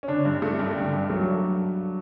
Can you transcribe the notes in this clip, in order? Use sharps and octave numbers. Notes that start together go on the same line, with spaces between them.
C#4
D3 D4
G2
A3 D4
G2
D3 G3
G2
F#3 A3